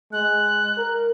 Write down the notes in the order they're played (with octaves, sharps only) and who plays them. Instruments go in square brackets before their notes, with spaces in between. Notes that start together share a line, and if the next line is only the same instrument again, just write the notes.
[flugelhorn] G#3 [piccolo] F#6
[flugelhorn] A#4